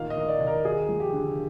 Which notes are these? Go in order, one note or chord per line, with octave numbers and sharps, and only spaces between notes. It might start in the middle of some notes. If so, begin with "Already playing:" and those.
Already playing: A#2 D#3 F5
D#5
D#3
D5
D#2
A#4
D#2 G#4
F3
G4
D3